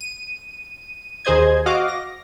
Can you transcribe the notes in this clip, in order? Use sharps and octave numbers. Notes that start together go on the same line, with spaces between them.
D#7
D#2 G#4 C5 D#5 G#6
F#4 D#5 F5 D6
A#6